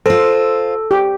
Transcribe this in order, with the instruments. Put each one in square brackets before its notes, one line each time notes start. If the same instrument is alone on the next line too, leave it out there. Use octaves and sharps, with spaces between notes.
[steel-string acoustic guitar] F4 C5 [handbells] A4
[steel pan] G4